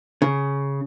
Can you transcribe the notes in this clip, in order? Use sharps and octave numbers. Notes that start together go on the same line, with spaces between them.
C#3